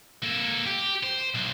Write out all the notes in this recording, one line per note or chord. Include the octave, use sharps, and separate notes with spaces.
A#3 A4
G4
C5
B1